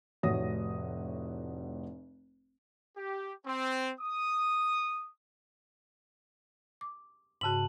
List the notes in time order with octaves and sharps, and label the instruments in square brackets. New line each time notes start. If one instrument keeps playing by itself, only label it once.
[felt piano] F1 A2 F#4 C#5 D#6 A#6
[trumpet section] G4
C4
D#6
[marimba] D6
[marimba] G#2 C#3 F#4 [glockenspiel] A5 F#7